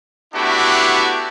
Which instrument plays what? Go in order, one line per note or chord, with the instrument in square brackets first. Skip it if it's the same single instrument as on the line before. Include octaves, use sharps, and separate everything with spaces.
[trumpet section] A3 B3 D4 E4 F#4 G4